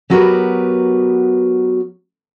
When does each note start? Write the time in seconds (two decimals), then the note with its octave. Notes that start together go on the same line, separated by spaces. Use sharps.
0.10 F#3 B3 F#4 G4 A#4 B4